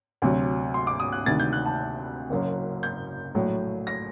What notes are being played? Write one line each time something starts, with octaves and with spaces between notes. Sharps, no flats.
D2 C3 F#3
C6
D6
D#6
F#6
D2 C3 D#3 A6
G6
F#6
A5
F#1 F#2 F#3
G6
A#1 A2 F#3
A#6